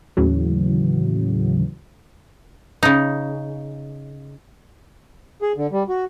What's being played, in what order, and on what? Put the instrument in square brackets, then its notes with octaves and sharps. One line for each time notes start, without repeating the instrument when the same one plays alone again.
[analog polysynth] D#2 A2 C#3 E3 F#3
[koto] C#3 D#4
[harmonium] G#4
D3
G3
F#4